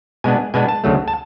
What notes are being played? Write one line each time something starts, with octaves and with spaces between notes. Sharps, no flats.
B2 G#3 B3 D4 G#5
B2 G#3 B3 D4 G#5
A5
D2 C#3 F#3 A3
A5